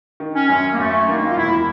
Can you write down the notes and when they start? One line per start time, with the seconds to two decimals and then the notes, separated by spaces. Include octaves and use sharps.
0.20 D#3
0.35 C#4
0.49 F#2 C#4
0.73 A#3
0.79 F#2 A3
1.08 D#3 A#3
1.30 F4
1.37 E1 E4